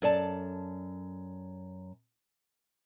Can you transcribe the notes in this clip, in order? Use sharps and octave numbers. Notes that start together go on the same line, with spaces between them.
F#2 A4 D5 A5